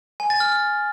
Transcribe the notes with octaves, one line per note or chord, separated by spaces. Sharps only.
G#5
A6
F6